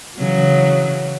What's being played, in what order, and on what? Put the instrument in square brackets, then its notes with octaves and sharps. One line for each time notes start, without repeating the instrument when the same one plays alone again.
[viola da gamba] C#3 E3 F#3